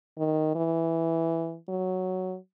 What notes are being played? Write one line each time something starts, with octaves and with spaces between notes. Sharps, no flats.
D#3
E3
F#3